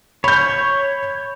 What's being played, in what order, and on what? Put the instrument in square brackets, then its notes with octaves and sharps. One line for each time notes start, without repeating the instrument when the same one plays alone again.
[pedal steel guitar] C#5 [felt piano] B5 G6